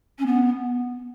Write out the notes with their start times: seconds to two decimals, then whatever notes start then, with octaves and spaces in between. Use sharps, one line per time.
0.18 C#4
0.26 B3